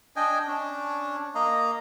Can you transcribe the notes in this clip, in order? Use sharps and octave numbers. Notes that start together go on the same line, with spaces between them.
D4 D#5 G5 G#5
C#4 D4
A#3 D#5 A#5